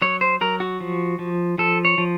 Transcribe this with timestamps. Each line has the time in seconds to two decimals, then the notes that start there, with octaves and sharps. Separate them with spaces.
0.02 F#3 C#5
0.21 C5
0.41 F#3 A#4
0.60 F#4
0.80 F3
1.19 F3
1.58 F3 A4
1.85 C#5
1.98 F3